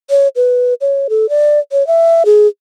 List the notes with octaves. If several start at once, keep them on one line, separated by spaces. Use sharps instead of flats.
C#5
B4
C#5
A4
D5
C#5
E5
G#4